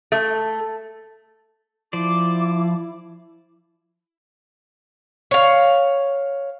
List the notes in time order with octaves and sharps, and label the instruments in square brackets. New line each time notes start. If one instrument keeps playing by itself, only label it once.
[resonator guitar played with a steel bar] A3
[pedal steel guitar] F3 C5 D5 [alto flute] E4 [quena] D6
[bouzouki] C#5 F5